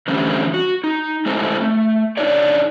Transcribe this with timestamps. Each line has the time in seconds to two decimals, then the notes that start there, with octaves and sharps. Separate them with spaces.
0.08 D3 E3 G3 A3 C4 C#4
0.54 F#4
0.84 D#4
1.26 G#3 A3 C4 D#4 E4 A4
1.61 A3
2.17 D4 D#4 G#4 C#5 D5